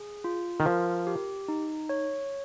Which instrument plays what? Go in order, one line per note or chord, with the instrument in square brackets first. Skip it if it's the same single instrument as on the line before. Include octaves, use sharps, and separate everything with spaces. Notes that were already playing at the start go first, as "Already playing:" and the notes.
Already playing: [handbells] G#4
F4
[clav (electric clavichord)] D#3
[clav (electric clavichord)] F3 [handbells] A#4
[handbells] G4
D#4
C#5